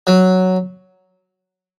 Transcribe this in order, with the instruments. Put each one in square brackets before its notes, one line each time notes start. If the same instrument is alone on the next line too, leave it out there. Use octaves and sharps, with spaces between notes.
[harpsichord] F#3